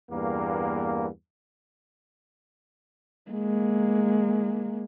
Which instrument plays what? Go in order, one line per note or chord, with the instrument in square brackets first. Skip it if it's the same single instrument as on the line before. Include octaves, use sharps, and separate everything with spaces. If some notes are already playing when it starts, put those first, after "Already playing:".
[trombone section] E2 G2 A#3
[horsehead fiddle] G#3 A#3